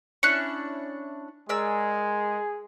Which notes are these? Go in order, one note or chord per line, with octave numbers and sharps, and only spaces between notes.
C#4 D4 E4 F#6 C#7
G#3 G#4 A#4 D5 E6